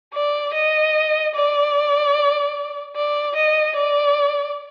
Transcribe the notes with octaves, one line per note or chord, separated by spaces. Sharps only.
D5
D#5
D5
D5
D#5
D5